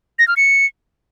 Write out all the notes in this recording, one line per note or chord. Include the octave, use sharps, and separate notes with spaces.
A#6
F6
C#7